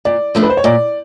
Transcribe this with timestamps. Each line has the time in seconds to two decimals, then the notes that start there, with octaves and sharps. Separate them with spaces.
0.05 A#2 D5
0.35 F3 A3 D4
0.43 B4
0.50 C5
0.57 C#5
0.64 A#2 D5